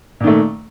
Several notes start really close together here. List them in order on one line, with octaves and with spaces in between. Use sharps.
A#2 D#3 A3